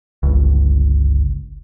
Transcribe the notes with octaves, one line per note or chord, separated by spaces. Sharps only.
G1 C#2